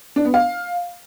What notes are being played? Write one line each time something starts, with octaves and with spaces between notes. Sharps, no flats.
D4
B3
F5